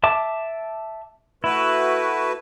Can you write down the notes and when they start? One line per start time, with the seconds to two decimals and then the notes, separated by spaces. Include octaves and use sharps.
0.04 E5 A5 D6
1.44 A3 E4 F#4 B4